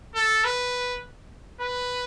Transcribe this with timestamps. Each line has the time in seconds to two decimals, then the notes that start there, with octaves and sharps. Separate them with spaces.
0.15 A4
0.44 B4
1.60 B4